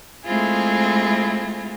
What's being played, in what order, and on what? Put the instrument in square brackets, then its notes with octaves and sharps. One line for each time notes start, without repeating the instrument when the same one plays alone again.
[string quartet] G#3 A3 C4 E4 F4 G#4